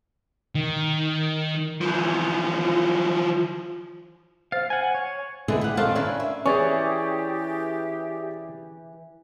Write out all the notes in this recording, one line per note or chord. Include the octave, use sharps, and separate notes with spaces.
D#3
E3 F3
C5 F5 A6
F#5 G#5
C#5
D3 D#3 B3 D#4 E4 G#4
G4 F#5
D#3 C4 G4 A4 F5 A5
C#4 D4 E4 A#4 B4
E5
E3 C#4 G4 G#4 D5 C#6